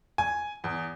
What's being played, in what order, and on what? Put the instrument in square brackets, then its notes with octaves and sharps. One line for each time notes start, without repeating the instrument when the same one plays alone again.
[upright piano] G#5
E2